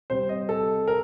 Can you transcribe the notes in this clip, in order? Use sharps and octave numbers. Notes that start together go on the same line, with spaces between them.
C3 G3 C4 C5
D#5
A4
A#4